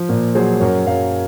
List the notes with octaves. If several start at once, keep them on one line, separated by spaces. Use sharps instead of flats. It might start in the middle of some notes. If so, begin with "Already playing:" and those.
Already playing: F3
A#2 A#4
F#3 G#4 C5
F#2 A#4 C#5
F#2 C#5 F5